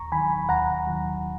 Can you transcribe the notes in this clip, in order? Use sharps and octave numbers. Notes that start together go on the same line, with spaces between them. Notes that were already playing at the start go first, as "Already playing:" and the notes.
Already playing: D#2 A#5 C#6
D#3 F#3 G#5 B5
D#2 F#5 A#5
D#3 F#3